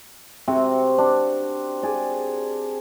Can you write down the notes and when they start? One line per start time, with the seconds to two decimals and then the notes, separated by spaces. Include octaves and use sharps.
0.48 C3 C4 F#4
0.98 D4
1.83 G#4 D5